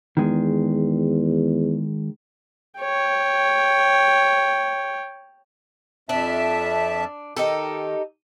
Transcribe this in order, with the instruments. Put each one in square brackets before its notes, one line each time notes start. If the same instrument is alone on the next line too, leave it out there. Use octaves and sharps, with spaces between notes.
[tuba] E2 [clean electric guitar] D#3 G#3
[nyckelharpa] C#5 G5
[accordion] F2 E5 A5 [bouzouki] D4
[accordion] D#3 [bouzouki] D#4 G4 A4